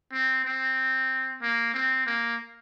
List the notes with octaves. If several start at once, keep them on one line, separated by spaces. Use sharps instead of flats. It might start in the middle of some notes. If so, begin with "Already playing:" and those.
C4
C4
A#3
C4
A#3